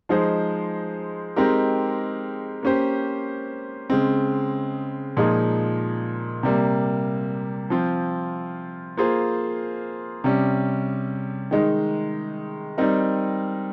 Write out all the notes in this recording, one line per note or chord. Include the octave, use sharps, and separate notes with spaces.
F3 G#3 D#4 G#4 C5
G#3 C4 D#4 G4 A#4
A#3 C#4 G4 C5
C#3 G#3 C4
A#2 F3 G#3 D#4 G#4
C3 G3 A#3
F3 C4 F4
A#3 F4 G#4 C5
C3 G3 C#4
D#3 G#3 D#4
G3 C4 D#4 A#4